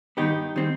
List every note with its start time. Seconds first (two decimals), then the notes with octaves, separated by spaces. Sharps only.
0.17 G2 D#3 B3 D#4 G4
0.56 D#3 G3 C4